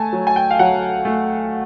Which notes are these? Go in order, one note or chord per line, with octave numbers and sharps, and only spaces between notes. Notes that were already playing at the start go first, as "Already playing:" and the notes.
Already playing: A3 G#5 A5
F#3
G#5
G5
F5
F#3 F#5
A3